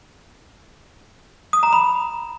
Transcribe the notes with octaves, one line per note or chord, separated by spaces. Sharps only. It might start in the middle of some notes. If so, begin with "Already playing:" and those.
D#6
A#5
B5